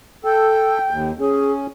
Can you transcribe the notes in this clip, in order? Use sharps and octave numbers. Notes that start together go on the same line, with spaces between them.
A4 G5
D#2
C#4 G#4